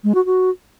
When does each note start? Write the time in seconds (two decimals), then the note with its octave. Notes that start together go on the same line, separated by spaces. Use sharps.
0.04 G#3
0.15 F#4
0.26 F#4